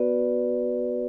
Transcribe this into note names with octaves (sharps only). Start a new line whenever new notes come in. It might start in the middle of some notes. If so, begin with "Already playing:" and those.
Already playing: B3 F#4 B4 D5